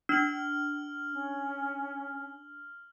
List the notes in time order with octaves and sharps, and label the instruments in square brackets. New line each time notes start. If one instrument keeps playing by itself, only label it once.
[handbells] D4 [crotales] F6 F#7
[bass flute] C#4